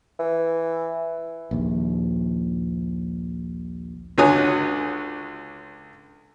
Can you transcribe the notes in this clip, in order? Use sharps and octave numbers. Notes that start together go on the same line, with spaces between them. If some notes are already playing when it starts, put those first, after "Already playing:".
E3
A#1 D#2
C#2 D3 F#4 C#5 G#5 D#6